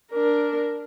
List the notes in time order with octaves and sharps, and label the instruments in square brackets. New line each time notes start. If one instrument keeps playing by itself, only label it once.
[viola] D4 A#4